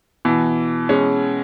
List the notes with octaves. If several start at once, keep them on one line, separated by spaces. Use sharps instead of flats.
B2 E3
G#3 C#4